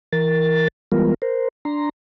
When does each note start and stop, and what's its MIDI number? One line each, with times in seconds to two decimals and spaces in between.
0.13 0.68 52
0.13 0.68 70
0.13 0.68 93
0.92 1.14 52
0.92 1.14 55
0.92 1.14 56
0.92 1.14 59
0.92 1.14 65
0.92 1.14 70
1.22 1.48 70
1.22 1.48 72
1.65 1.89 62
1.65 1.89 82
1.65 1.89 84